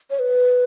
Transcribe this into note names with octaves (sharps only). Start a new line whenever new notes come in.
C#5
B4